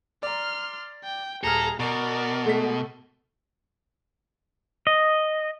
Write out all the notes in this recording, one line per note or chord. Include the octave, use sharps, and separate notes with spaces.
D5 A#5 C6 F6
G5
D#1 G#4 A4 A#5 F6
B2 A#4 D5 A#5 C#6
G#3 A3 B6
D#5